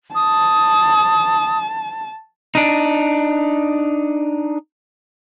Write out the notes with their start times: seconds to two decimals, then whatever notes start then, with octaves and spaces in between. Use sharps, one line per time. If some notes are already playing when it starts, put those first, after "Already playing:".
0.15 A5 D#6
2.55 D4 D#4